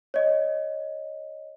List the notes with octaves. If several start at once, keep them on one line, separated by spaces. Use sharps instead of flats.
C#5 D#5